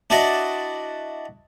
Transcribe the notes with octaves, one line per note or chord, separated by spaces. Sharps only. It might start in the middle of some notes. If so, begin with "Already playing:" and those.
D4 E4 F#4 D5 D#5